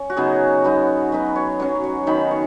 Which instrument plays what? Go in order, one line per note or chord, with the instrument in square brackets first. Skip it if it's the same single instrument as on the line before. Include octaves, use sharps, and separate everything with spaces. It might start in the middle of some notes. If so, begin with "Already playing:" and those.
Already playing: [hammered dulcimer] C#4
F#4
C#3 F#3 B3 D#4 G#4
F#3 B3 D#4
F#3 B3 D#4 B4
C#5
F#3 C#4 C#5
C#5
D#3 B3 D#4 B5
C#6